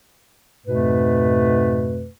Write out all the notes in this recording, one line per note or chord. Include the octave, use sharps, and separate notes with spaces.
F2 G#2 B2 A3 B4